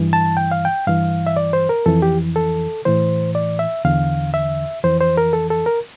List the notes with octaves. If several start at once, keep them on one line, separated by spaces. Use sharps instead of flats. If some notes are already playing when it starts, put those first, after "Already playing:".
Already playing: G2 E3
A5
G5
F5
G5
G2 E3 F5
E5
D5
C5
A#4
F2 E3 A4
G4
A4
A2 E3 C5
D5
E5
E2 D3 F5
E5
F2 E3 C5
C5
A#4
A4
A4
A#4